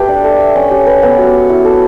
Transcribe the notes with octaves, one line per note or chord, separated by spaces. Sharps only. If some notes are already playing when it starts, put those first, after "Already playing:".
Already playing: A3 G4 B4
D4
A4
E5
C#4
G4
B4
B3
F#4
C#5
E4
A4